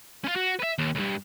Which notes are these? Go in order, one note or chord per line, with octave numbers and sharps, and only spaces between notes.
C#4 F4
F#4
B4 E5
D#2
C#2 G2